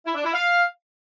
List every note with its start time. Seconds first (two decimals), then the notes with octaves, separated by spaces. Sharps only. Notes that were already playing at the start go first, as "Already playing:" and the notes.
0.06 E4
0.15 D4
0.24 E4
0.33 F5